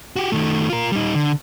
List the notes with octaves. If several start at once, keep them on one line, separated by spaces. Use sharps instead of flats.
F#4 G4
D#3 A3
F4 A#4
G3 D#4
D3